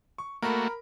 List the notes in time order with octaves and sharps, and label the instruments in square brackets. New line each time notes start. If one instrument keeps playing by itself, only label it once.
[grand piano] C#6
[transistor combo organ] A3 A#3 F#4 [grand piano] A#4 B5